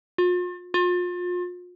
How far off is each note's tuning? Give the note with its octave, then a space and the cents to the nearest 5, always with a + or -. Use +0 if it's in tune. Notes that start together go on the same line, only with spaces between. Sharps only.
F4 +40
F4 +35